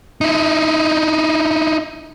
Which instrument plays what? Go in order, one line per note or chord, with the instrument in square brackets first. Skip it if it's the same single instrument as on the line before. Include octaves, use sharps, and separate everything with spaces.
[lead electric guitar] D#4 E4